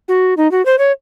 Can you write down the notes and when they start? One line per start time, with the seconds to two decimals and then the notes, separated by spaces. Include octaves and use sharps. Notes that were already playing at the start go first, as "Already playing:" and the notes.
0.08 F#4
0.37 D#4
0.51 F#4
0.66 C5
0.79 C#5